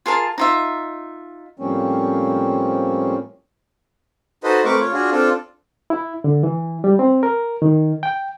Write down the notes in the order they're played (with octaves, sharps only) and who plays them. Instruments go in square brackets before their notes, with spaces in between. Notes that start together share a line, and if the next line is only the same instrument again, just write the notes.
[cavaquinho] F4 G#4 A#4 A5
D#4 F4 E5
[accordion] A2 F3 G3 A#3 C4 C#4
[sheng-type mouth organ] D#4 F#4 A4 B4 C5 D#5
A3 C4 A#4 B4 C#6 D6
F4 C#5
D4 F4 F#4 G#4
C4 D4 F4 A4
[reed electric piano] E4
D3
E3
G3
C4
A#4
D#3
G5